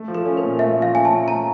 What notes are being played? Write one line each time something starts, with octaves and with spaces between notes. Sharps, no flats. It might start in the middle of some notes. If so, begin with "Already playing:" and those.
Already playing: A3
F3
A4
C#4
A#4
A#2
A3 E5
F3
F5
C#4 G#5
A5
A#2
A3 A#5